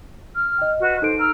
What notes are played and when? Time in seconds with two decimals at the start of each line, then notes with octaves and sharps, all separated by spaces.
0.35 F6
0.58 D#5 G5
0.80 F#4 B4
1.02 D#4 A4 C5 D7
1.19 A#5 E6 F6